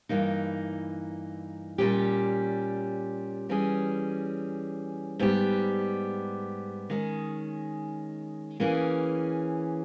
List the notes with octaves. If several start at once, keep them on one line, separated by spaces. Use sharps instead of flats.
G2 E3 A#3 D#4
A#2 G3 C#4 G4
E3 G3 C#4 G#4
G#2 G3 B3 G4
D#3 G#3 C#4
E3 A#3 C#4 G#4